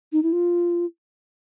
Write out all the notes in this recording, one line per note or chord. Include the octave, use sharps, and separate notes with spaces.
D#4
E4
F4